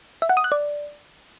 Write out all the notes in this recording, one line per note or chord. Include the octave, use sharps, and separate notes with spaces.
E5
F#5
D#6
F#6
D5